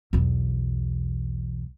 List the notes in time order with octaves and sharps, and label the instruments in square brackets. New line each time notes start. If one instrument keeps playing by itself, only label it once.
[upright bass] B1 E2